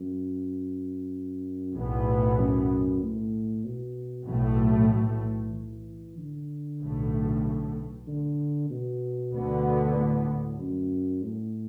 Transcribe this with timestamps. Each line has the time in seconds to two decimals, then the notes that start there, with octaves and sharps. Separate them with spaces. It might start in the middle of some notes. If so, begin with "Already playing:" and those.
Already playing: F#2
1.75 B1 E2 A2 E3 B3
2.38 F#2
3.03 A2
3.65 B2
4.28 B1 A2 E3 A3
4.92 E3
5.55 E3
6.17 D3
6.81 B1 A2 A3
8.07 D3
8.70 B2
9.33 D2 D3 B3
9.96 A2
10.28 A2
10.60 F#2
11.24 A2